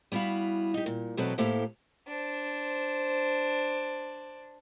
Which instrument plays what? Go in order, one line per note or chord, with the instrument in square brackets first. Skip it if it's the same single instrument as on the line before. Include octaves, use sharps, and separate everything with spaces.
[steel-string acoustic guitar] G3 B3 E4 F#4 F5
D#4 G4
A#2
E2 B2 F#3 C4 A4 B4
A2 A#3 E4 G4 A4 C5
[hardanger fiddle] D4 C5